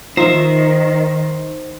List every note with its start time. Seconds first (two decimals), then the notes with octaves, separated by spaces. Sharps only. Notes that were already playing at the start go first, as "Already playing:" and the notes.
0.17 D#3 D#4 F4 C5 E5